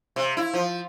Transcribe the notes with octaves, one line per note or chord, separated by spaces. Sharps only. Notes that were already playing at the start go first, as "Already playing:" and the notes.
C3
E4
F3